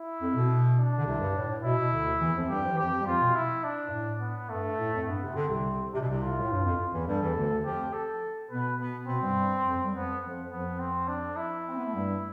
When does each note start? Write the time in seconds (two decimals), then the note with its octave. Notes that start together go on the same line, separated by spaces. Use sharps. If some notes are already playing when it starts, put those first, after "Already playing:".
Already playing: E4
0.20 F2
0.34 B2
0.77 D4
0.98 D3
1.06 C2 C3
1.20 G2
1.35 A2
1.49 A2
1.63 B2 E4
1.78 B2
1.92 D2 D3
2.20 E2 E3
2.35 F2 F3
2.49 G2 G3 G4
2.64 F3
2.72 E3
2.78 F2 F3 G4
3.02 G3
3.06 F2 F3 F4
3.21 B2
3.35 E4
3.64 D4
3.87 G2
3.92 A2
4.21 B3
4.49 G2 A3
4.78 A2
4.93 F2
5.07 G2 B3
5.22 C3
5.35 D3 C4
5.48 C2 C3
5.93 C3 D4
6.01 B2
6.09 C2 C3
6.21 F4
6.38 A2
6.50 G2
6.64 F2
6.93 E2 E3
7.07 G2 G3 A4
7.21 E2 E3
7.36 D2 D3
7.64 F2 F3 G4
7.93 A4
8.50 B2 B3 B4
8.79 B2 B3
9.07 B2 B3 C4
9.22 G2 G3
9.65 F2 F3
9.84 G3
9.93 F2 F3 B3
10.22 F2 F3
10.50 F2 F3 B3
10.80 C4
11.08 D4
11.37 E4
11.68 C4
11.77 B3
11.86 A3
11.94 G2 G3